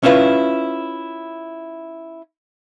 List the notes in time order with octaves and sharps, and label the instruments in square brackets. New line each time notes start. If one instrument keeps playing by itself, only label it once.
[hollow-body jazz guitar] C#4 E4 F4 B4